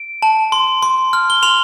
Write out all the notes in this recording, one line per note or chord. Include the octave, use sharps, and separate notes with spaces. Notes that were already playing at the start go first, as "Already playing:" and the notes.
Already playing: D7
A5
C6
C6
F6
G7
C6 F7